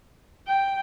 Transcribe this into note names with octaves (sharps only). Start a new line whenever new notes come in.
G5